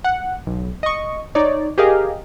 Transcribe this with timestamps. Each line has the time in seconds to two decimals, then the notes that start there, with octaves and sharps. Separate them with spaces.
0.04 F#5
0.47 B1
0.83 D#5 C#6
1.35 D#4 C#5 D5
1.78 G4 G#4 A#4 D#5 F5